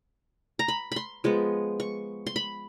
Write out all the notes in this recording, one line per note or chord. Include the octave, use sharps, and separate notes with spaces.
A#5
B5
B5 C6
F3 G#3 B3
C#6
C6
B5